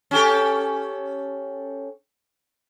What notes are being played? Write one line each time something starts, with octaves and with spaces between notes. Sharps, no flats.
C#4 G4 A4